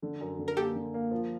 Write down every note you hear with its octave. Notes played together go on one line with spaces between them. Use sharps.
D3
F#2
D3
A#4
A#3 G4 A4
D3
A#3
F3